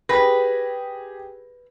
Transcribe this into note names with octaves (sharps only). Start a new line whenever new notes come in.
G4 G#4 B4 A#6